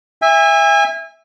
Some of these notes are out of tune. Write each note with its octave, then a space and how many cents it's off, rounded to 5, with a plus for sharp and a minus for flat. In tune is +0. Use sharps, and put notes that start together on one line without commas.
E5 +0 G#5 -35